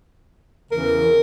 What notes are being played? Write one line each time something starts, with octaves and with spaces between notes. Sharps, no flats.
E2 C#3 E3 A#4